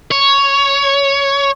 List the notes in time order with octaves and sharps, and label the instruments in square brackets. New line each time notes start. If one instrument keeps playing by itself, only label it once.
[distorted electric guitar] C#5